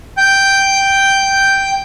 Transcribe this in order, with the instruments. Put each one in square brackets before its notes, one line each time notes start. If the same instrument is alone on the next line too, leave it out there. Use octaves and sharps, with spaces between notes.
[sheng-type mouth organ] G5 G6